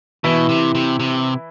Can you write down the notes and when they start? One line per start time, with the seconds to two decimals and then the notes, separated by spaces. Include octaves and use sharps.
0.24 B2 E3 E4
0.49 C3
0.75 C3
0.99 C3